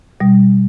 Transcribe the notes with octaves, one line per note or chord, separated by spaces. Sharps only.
B2 G3